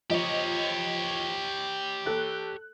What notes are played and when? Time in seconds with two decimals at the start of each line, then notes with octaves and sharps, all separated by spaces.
0.10 F3 G4 C#5 D#5
2.06 A4 F#6